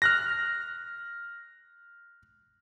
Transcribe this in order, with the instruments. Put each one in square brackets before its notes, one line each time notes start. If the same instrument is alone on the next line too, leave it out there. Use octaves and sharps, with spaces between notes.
[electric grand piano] F6 F#6 A#6